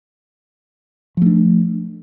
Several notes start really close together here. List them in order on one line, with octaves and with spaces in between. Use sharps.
F3 A3 D4